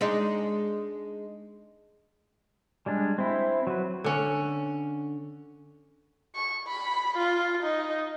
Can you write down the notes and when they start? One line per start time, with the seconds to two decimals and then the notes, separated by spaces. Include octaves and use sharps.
0.01 G#3 D4 D#4
2.86 G3 G#3 D4
3.18 C4 E4
3.67 F#3 B4
4.04 D3 C#4
6.35 C#6
6.67 B5
7.18 F4
7.63 D#4